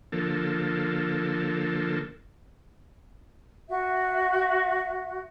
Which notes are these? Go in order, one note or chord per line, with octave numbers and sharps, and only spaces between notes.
D3 F3 A#3 A4
F#4 E5